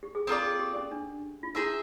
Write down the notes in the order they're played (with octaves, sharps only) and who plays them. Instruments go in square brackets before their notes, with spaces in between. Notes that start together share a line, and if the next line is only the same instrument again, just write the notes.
[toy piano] G4
G#4
[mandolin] C4 F4 A#4 D5 [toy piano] A4
[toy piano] G#4
G4
C#4
D4
F4
[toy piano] E4 [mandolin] G#4 C5 E5